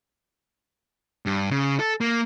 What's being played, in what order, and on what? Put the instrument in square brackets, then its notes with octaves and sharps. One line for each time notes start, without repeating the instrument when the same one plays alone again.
[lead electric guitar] G2
C#3
A4
A#3